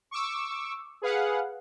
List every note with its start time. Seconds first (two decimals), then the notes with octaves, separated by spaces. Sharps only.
0.11 C#6 D6 E6
1.02 G#4 B4 F5 F#5